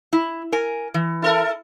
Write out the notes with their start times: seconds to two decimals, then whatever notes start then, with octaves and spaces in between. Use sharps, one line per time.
0.13 E4
0.52 A#4 G#5
0.94 E3
1.22 E4 A4 A#4